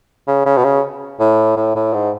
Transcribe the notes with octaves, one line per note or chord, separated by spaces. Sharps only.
C#3
C#3
B2
C#3
A2
A2
A2
G#2